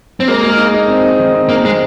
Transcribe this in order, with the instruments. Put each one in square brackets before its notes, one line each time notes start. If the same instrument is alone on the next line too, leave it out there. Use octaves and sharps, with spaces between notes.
[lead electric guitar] C4
[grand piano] G#3 [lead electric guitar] A#3
[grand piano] G#3
D#4
D#4
C4
D#4
D#3
C4
[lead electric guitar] A#3 [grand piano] D#4
[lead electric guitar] G#3 [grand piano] C4